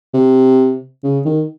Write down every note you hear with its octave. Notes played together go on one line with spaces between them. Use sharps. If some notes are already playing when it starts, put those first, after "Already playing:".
C3
C#3
D#3